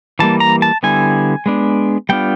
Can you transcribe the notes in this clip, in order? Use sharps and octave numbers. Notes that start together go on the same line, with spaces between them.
E3 G3 A#3 A5
A#5
A5
D3 G3 B3 E4 G#5
G#3 B3 D4
G3 B3 D4 F4 G5